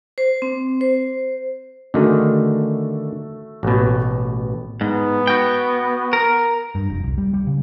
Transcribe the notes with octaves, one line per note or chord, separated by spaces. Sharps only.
C5
C4
C5
D3 D#3 A3 F#4 G#4 A4
A1 B2
G#2 B3
F#4 G5
A#4
G2
F1
C2
G3
G3
C#3